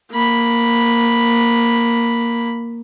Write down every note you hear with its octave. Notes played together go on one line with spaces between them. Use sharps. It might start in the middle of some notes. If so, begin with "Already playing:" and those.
A#3 B5